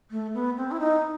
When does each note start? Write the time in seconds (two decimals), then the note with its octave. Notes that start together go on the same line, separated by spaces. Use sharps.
0.11 A3
0.34 B3
0.57 C4
0.71 E4
0.80 D#4